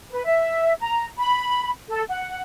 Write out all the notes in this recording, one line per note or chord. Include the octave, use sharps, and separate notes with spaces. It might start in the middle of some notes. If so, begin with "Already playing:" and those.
B4
E5
A#5
B5
A4
F#5